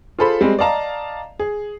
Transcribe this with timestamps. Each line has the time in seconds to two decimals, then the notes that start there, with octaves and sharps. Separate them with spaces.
0.19 F4 G#4 A4 C5 B5
0.41 G3 G#3 C4
0.59 D5 D#5 F5 A5 A#5
1.40 G#4